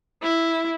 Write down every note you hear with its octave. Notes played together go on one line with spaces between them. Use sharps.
E4